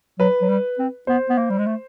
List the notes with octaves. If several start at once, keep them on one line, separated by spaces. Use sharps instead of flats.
F#3 B4
F#3
G3
C4
B3 C5
B3
A#3
G3
G#3
A3